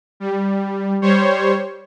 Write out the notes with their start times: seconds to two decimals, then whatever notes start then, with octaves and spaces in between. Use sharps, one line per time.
0.20 G3
1.02 G3 C5 C#5